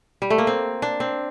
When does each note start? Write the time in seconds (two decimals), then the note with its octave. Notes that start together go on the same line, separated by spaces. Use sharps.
0.22 G3
0.30 A3
0.38 A#3
0.47 C4
0.82 D4
1.00 C4